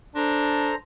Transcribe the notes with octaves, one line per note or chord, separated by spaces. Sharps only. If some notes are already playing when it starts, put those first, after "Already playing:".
D4 A4 C5 A#5